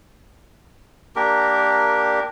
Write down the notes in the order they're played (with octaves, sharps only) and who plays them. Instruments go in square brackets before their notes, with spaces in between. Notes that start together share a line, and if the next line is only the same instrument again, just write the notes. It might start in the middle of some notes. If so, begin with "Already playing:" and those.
[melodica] A#3 D4 G4 A#4